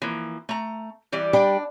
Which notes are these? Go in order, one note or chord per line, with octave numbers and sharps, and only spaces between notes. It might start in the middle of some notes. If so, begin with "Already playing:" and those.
E3 F3 A#3
A3 A#5
E3 G3 D5
G3 D4 G5